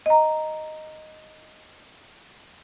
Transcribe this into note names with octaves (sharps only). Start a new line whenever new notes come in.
D#5 A#5